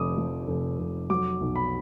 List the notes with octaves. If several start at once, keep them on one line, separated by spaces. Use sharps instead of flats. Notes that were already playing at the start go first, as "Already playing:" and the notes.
Already playing: F1 D3 F3 D6 D#6
F3
F1
F1
F#3 D6
B1
B5